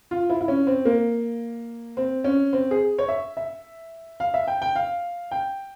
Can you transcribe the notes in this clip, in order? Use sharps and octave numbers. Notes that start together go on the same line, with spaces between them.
F4
E4
E4
C#4
C4
A#3
C4
C#4
C4
G#4
C#5
E5
E5
F5
E5
G5
G5
F5
G5